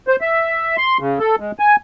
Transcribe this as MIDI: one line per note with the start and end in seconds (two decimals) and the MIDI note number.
0.08 0.16 72
0.21 0.77 76
0.77 0.98 84
1.00 1.19 49
1.19 1.36 69
1.40 1.52 56
1.59 1.76 80